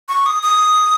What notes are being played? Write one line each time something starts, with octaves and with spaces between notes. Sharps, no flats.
C#6
D#6
D#6